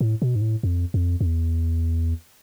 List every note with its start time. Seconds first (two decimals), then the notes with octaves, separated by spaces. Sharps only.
0.01 A2
0.22 B2
0.36 G#2
0.42 A2
0.63 F2
0.94 F2
1.21 F2
1.26 E2